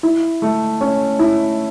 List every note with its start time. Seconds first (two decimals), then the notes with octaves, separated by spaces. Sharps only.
0.03 E4
0.42 A3
0.81 C#4
1.19 E4